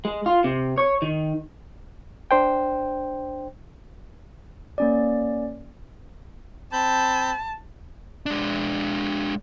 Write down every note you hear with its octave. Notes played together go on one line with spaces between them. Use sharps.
G#3
F4
C3
C#5
D#3
D4 C5 G5
A#3 C#4 D5
C4 A5 B5 G6
G#3 D4